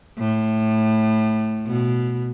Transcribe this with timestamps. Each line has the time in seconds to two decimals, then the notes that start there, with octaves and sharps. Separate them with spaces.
0.18 A2
1.67 B2